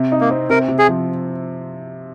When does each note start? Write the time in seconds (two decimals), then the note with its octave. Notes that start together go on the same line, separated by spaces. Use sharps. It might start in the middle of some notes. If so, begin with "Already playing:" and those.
Already playing: C3
0.12 D#4
0.21 A#3
0.30 C4
0.50 C3 A#4
0.68 C3
0.79 G#4
0.89 F3